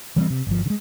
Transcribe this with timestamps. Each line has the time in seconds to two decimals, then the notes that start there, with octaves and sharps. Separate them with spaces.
0.16 E3 G3 G#3 C4
0.30 C3
0.47 G1 F3
0.66 D3 G#3